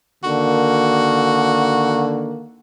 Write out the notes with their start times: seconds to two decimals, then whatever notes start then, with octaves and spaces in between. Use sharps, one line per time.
0.24 D3 D#3 A#3 F#4